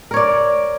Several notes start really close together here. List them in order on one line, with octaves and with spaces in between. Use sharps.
A#4 C#5 D5